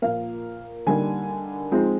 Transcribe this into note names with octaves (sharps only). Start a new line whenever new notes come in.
A#2 F3 A#3 F5
D3 G3 A#3 D#4 G#5
F3 G#3 C4 D#4